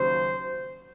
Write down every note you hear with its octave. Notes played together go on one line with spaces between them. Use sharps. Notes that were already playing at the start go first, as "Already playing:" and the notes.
Already playing: D#2 C#3 F#3 C5